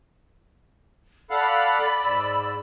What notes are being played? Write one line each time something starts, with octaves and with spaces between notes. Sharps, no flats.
A4 D5 F5 F#5 B5
G#2 E6